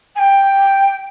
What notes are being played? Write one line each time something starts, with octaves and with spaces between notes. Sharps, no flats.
G#5
G5